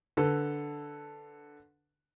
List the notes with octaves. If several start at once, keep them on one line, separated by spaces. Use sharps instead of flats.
D3 A4 B4